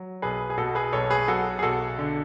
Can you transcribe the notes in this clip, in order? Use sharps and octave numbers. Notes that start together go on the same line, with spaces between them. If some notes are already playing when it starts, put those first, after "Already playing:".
Already playing: F#3
B1 G#4 B4
G#4
B2 F#4 A4
G#4 B4
B1 A4 C#5
G#4 B4
F#3 F#4 A4
G#4
B1 F#4 A4
D3